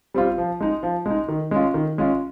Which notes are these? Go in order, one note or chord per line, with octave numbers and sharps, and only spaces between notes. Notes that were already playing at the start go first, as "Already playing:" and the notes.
G3 C4 F4
F3
G#3 D#4
F3
G#3 D#4
D#3
G#3 C#4 F4
D#3
G#3 C#4 F4